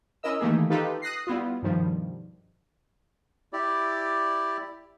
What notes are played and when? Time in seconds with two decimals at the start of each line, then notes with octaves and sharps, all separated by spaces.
0.23 C#4 E4 A#4 D#5 E6
0.40 D#3 E3 A3 A#3 G4 G#4
0.70 D#4 F4 G4 A4 B4
1.02 D#6 F#6 A#6 C7
1.27 G3 B3 E4 F4
1.63 G2 B2 D#3 F3 G3
3.53 E4 G4 D5